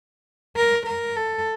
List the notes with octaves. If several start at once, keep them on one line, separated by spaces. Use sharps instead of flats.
A#4
A#4
A4